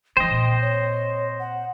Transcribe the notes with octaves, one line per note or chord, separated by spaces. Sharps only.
D3 F3 C5 D#5 G5
A#2 C4
C#5
F#5